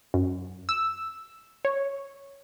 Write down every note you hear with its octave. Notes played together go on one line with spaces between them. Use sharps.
F#2
E6
C#5